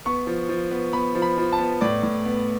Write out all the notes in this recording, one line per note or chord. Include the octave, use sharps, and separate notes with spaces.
B3 C#6
F3
F3
B3
B3 B5
F3
B5
F3
A5
B3
A2 D5
A2
B3